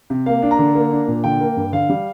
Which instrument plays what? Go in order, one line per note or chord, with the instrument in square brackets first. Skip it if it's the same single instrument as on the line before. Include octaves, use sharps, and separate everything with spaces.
[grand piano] C3
A#3 F5
D4
A#5
D3
A#3
D4
A#2
D3 G5
A#3
G2
D3 F5
G3